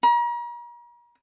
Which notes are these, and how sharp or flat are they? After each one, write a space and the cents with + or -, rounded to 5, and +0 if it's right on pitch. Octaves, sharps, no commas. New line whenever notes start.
A#5 +40